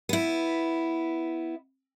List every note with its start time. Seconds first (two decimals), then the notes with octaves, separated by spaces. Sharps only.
0.09 B3 E4